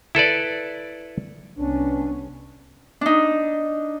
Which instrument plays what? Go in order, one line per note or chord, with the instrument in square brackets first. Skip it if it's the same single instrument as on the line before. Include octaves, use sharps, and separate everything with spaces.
[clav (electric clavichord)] E4 A4 B4 D5
[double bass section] C2 B3 C#4 [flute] D4
[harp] D4 D#4